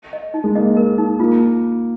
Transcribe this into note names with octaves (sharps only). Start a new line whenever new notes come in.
D#5
D#4
G#3
A#3 D#5
A#4
D#4
A#3 F4